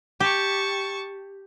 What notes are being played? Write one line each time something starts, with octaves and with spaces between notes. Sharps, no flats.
G4 A5 C#6